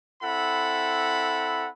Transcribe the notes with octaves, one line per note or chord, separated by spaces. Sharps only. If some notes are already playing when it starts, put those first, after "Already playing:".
C4 E4 A4 F#5 B5